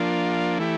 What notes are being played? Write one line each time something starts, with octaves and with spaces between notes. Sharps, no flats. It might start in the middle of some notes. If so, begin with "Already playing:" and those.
Already playing: F3 A#3 D4 F4
E3 A3 E4 G4